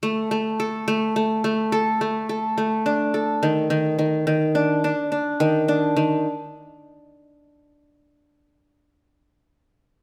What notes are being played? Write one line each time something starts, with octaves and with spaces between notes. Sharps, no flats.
A3
A3
A4
A3
A3
A3
A4
A3
A4
A3
D4
A4
D#3
D#3
D#3
D#3
D4
D4
D4
D#3
D4
D#3